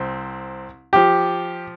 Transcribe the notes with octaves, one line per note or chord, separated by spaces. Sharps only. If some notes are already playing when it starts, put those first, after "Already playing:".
Already playing: C2 C4
F3 G4